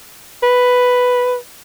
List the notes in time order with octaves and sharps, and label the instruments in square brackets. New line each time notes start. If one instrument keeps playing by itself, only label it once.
[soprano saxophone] B4